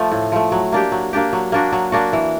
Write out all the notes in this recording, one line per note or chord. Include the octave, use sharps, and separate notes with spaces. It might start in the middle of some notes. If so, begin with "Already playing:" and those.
Already playing: F3 A3
A2
F3 A3
F#3
A#3 D4 G4
F#3
A#3 D4 G4
F#3
A#3 D4 F#4
F#3
A#3 D4 F#4
E3